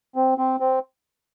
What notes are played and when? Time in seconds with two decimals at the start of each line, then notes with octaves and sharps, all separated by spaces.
0.16 C4
0.38 C4
0.60 C4